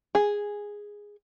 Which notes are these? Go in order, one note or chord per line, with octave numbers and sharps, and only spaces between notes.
G#4